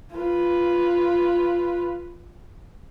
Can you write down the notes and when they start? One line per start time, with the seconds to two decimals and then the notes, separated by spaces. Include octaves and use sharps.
0.14 F4 B4